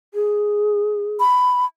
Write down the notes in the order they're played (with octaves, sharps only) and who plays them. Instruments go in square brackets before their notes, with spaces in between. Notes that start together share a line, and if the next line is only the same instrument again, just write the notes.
[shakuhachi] G#4
[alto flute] B5